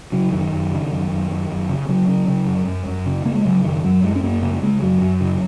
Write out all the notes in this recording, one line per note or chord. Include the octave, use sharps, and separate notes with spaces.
C#3 F#3
F#2 D#3
F#2
C#3
F#2
F#2
F#2
F#2
C#3
C#3 F#3
C#3
C#3
F#2
F#2
F#2
C#3
C#3 A#3
G#3
C#3 F#3
F#2 D#3
F#2 F#3
F#2 G#3
C#4
F#2 A#3
C#3 A#3
A#3
C#3 G#3
F#2 F#3
F#2
C#3